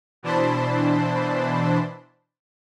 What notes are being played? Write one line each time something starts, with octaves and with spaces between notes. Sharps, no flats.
B2 E3 D4 C5 A5 B5